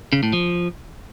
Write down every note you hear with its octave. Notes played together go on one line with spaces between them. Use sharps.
C#3
A2
F3